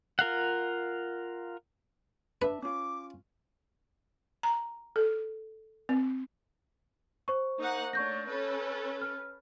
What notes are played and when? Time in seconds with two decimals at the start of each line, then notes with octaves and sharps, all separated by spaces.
0.19 F4 A#4 F5 F#5
2.42 D4 B4 E5
2.62 C#4 F4 D6
4.43 A#5
4.96 A4
5.89 C4
7.28 C5 C#6
7.57 A#3 D#4 F#5
7.93 A3 D4 C#5 C#6 G6 A#6
8.26 C#4 A4 B4
9.01 F6